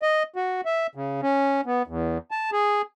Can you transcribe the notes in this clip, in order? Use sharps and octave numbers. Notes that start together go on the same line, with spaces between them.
D#5
F#4
E5
C#3
C#4
B3
E2
A5
G#4